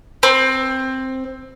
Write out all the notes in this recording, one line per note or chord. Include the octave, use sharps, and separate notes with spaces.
C4